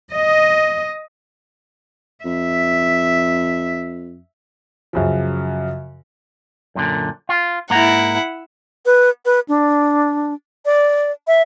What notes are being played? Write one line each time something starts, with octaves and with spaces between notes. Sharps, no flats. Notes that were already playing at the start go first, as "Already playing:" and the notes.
D#5
F2 E5
F#2 C#3 F3
F#2 A#2 D3
F4
G#2 A#3 E4 F#5 A#5
B4
B4
D4
D5
E5